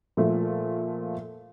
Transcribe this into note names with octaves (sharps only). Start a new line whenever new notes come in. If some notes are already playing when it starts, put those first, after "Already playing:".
A#2 F3 A3